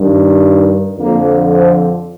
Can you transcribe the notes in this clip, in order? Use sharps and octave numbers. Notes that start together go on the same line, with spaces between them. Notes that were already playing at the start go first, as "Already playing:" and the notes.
Already playing: G2 D#3
F2 D3 F3 A#3
C4